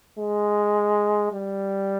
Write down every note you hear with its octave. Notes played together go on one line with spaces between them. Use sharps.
G#3
G3